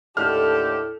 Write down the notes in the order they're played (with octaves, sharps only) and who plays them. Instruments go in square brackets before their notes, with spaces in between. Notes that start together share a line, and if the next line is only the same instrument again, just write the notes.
[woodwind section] D#2 D3 G4 [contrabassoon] A2 [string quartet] A4 [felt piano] F6